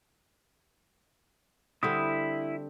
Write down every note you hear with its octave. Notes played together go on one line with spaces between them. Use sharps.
D3 G3 C4 E4 D#6